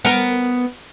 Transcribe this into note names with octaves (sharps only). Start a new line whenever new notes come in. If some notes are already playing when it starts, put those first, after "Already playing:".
B3 A#4